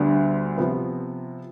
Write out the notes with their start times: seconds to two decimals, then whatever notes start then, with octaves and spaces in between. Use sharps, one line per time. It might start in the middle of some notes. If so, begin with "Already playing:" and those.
Already playing: D2 D3 G3 B3 D4
0.57 C3 F3 B3